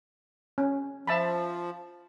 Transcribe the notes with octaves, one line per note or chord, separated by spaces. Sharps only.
C#4
F3 E5 A5 B5